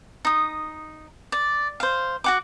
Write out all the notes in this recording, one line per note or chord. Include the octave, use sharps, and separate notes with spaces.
D#4 D#6
D5
C5 F5
F#4 F#5 D6